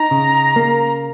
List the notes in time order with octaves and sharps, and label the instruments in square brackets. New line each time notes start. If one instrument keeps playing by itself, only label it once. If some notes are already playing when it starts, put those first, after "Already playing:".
Already playing: [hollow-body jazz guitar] D#4 [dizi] A#5
[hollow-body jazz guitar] C#3
A#3